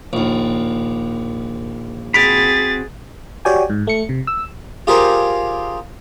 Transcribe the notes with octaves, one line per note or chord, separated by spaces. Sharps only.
A#1 D#2
C4 F#4 G#4 B5 A6 B6 D7 F7
F#4 G4 C#5 D5 G5 G#5
G#2
A3 C#7
C3
E6
F4 G4 G#4 A#4 C5 F5